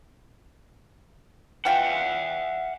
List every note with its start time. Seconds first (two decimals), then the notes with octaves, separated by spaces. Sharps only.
1.65 E3 F4 E5 F#5 G5